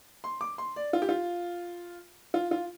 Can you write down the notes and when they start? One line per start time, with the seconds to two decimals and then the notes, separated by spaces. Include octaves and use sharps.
0.24 C6
0.41 D6
0.58 C6
0.76 D5
0.93 F4
1.02 G4
1.09 F4
2.34 F4
2.51 F4